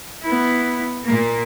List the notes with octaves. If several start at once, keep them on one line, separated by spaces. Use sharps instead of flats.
B3 E4
A#2 A#3